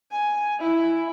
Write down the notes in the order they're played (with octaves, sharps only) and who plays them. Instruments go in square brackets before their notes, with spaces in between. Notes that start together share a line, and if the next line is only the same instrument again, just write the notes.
[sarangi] G#5
E4